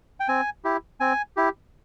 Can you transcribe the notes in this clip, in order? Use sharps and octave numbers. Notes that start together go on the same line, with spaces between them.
G5
C4 G#5
E4 G4
C4 G#5
E4 G4